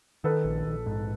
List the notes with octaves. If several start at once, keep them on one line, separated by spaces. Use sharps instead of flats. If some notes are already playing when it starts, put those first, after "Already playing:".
D#3 A4 B4
A#1
A#1
G#2